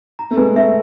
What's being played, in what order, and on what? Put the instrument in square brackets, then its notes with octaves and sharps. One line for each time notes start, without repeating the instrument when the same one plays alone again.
[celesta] A#5
[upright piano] A3
[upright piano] G#3 [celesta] B4
[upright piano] A3 [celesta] E5